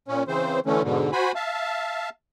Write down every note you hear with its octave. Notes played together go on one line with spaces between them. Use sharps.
A#2 C#4
C#3 E3 C4 C5
D3 E3 A3 C#4
G#2 B2 D3
F#4 C5 G#5 B5
E5 F5 A5